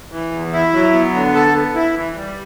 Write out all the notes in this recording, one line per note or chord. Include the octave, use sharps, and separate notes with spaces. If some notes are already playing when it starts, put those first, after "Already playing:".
E3
E2
E4
F#3
B3
D3
A4
B3
E4
E3
G3